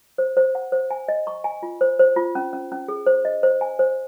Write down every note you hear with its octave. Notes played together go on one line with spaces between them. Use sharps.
C5
C5
F#5
C5
G#5
D#5
C#6
G#5
F4
C5
C5
F4
C#4
C#4
C#4
G#4
C5
D#5
C5
G#5
C5